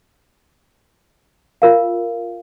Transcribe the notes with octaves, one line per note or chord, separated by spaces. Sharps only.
F4 A#4 F5